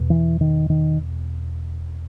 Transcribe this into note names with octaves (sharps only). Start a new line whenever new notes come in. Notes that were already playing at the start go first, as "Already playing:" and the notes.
Already playing: E2 B2
E3
D#3
D#3